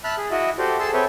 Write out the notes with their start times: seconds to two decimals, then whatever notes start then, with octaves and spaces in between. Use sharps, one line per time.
0.04 E5 A5 B5 F6 F#6
0.18 G#4
0.31 E4 F#4 D#5 E5
0.58 F#4 G4 A4 C5 D5
0.80 G#4 A4 A5 C6 E6
0.94 C4 A4 B4 C#5 E5 G5